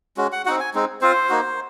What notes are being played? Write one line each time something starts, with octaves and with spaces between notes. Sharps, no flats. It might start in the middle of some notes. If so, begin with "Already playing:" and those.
G#3 C#4 F#4
F#5
C4 D#4 F#4 F#5
G#5
G#3 C4 D#4
C4 F4 C5
A#3 D#4 F#4